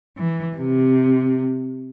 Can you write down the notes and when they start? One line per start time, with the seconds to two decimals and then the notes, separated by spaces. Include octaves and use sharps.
0.17 E3
0.56 C3